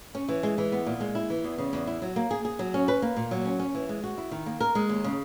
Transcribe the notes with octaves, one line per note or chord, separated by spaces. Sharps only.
C#4
E3
G#3
E3
B3
A#2
G#3
E4
E3
E2
C#3
E2
E4
F#3
A#3
G#4
G#4
F#3
C#4
B4
A#3
A#2
F#3
C#4
C#4
E3
G#3
F#4
E4
D#3
A#3
A#4
G#3
D#2
C#3